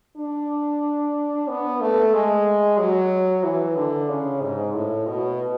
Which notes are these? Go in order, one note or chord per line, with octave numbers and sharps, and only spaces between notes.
D4
B3
A3
G#3
F#3
E3
D3
C#3
G#2
A2
B2